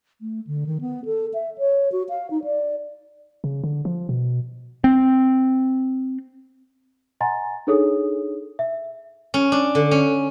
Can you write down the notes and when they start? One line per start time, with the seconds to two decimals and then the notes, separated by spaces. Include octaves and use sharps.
0.21 A3
0.47 D3
0.67 D#3
0.81 B3
1.05 A4
1.34 E5
1.58 C#5
1.92 F#4
2.09 F5
2.30 D#4
2.44 D5
3.44 C#3
3.64 D3
3.85 F3
4.09 B2
4.84 C4
7.21 D#5 F#5 G#5 A#5 C6 A6
7.67 D4 D#4 G#4 A4 C#5 D#6
8.59 E5
9.34 C#4
9.52 D4
9.75 D3
9.91 C#4